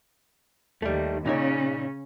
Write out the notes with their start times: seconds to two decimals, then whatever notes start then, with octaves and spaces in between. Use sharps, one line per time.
0.82 D#2 D#3 G3 A3
1.26 A#2 C#3 C#4 D#4 C#5